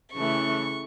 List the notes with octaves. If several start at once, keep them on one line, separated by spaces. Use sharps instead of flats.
C#3 E3 A3 C#6